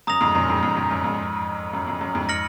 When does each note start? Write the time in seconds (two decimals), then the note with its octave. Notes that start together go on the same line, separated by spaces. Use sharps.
0.07 F#2 A#5 D#6 A#6 F7
0.21 F2 G#2
0.35 F#2 A#2
0.49 F2 G#2
0.63 F2
0.77 F2
0.91 F#2
1.04 F2 G#2
1.73 F#2
1.87 F2
2.01 F#2
2.15 F2 G#2
2.29 F6 A#6 C#7 F#7